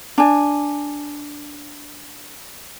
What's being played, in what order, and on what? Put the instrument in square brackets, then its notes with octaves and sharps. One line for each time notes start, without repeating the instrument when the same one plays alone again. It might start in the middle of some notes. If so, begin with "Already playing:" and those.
[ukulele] D4 G#5